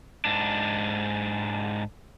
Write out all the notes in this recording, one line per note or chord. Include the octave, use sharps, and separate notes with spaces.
G#2 D4